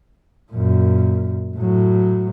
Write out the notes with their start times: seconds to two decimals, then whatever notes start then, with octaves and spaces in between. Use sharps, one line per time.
0.52 F#2 A#2
1.57 A2 F#3